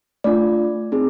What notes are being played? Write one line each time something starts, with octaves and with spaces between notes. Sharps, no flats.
A3 D4 F4 D5
C4 D#4 G#4